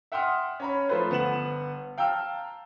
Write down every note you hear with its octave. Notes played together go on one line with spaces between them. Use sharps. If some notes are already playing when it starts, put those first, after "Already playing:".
E5 F#5 G5 C6 D#6 F6
C#4 A#5 B5
F3 A3 F4 B4 C5
G1 B3 F#5 E7 F#7
F5 G5 A5 A#5 E6 F6